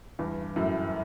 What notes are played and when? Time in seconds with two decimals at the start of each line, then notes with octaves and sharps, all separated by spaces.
0.19 E2 G2
0.56 F#2 A2